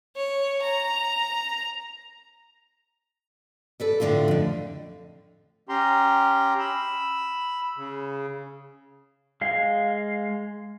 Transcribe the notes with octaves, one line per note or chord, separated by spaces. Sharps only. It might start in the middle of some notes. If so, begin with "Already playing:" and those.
C#5
A#5
A4 B4 D5
A2 D3 D4 E4 F4
F2 D3
C#4 G4 A#5 C6
B5 E6
C#3
G#3 F5